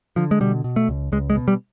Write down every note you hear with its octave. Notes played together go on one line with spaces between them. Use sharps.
D3 F3
G#3
B2 G3
B2
A3
C#2
C#2 G#3
G#3
B2
G3